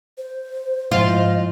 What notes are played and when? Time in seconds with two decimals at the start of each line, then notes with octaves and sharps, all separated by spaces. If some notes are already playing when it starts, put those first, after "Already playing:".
0.18 C5
0.92 G#2 F3 E4 F4 D#5